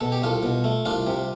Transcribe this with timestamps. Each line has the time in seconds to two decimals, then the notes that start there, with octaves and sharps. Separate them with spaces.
0.01 B2 A4
0.12 G4
0.22 C2 F4 A4
0.43 B2
0.64 A3
0.85 C2 D4 F4
1.07 C3